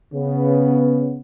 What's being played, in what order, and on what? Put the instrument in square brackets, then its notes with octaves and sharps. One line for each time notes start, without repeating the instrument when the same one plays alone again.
[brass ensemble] C#3 B3